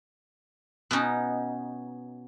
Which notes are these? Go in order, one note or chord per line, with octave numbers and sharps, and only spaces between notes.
B2 B3 C#4 D#4